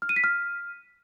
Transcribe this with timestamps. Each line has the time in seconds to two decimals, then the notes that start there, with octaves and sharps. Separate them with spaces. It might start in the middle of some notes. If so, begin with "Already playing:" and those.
0.02 F6
0.09 D#7
0.16 B6
0.24 F6